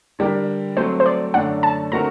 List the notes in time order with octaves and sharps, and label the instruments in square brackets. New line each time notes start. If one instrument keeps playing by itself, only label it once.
[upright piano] D3 G3 D4 G4 A#4
[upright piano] F#3 A3 C4 [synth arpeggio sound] C5
[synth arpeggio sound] C5
D5
[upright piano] F#2 D3 A3 D4 [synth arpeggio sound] F#5
[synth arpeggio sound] A5
[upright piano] D3 A3 C4 F#4 A#4 [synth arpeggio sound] A#5